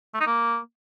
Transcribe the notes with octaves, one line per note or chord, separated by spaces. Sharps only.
A3
D#4
A#3